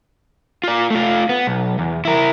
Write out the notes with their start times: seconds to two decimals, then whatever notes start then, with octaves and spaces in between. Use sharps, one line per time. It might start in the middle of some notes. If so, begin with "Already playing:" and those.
0.64 F4 D5
0.90 A3 F4
1.29 B3
1.47 B1
1.79 E2
2.05 E4 A#4